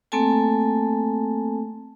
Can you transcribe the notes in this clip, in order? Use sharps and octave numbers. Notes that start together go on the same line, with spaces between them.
A3 A#3 C4 A4 G#5 A5